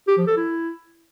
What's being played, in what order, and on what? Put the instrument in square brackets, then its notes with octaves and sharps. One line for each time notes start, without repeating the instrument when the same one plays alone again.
[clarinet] G4
F3
A4
E4